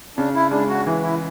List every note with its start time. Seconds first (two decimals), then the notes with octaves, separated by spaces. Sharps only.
0.17 C#3 D4
0.35 E4
0.51 G#3 D4
0.69 F#4
0.87 E3
1.03 E4